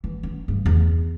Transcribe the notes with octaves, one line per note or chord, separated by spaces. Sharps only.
E3
C#4
G2
E2